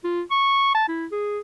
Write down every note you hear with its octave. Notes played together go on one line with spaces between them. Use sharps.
F4
C#6
A5
E4
G#4